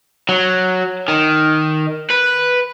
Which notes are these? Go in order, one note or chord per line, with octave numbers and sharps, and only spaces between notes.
F#3
D#3
B4